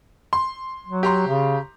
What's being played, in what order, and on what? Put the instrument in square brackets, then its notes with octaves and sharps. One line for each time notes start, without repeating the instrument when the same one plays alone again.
[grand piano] C6
[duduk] F#3
[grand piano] G4 A#5 C6
[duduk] C#3